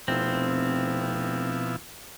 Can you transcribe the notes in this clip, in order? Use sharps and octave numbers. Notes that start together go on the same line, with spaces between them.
F1 B2 F3 C4 E4